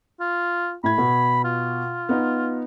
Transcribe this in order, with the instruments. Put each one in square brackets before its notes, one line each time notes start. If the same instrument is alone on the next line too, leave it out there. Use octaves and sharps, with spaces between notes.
[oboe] F4
[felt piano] A2 G#6 [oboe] B5
[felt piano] B2
[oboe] F4
[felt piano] B3 D#4